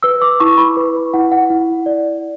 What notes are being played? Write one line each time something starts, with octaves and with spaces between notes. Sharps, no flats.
B4 E6
D6
E4 C#6
B5
B4
E4 F#5
F#5
E4
D5